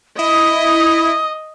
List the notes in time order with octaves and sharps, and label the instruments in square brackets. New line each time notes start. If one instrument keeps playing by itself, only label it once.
[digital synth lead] E4 [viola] D#5 [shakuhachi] D#6